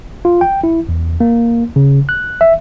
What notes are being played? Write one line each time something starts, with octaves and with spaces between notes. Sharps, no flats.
F4
G5
E4
E2
A#3
C#3
F#6
E5